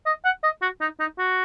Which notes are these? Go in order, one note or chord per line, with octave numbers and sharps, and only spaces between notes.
D#5
F#5
D#5
F#4
D#4
D#4
F#4